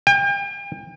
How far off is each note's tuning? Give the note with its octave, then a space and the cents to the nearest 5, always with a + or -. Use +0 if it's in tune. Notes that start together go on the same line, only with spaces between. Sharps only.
G5 +40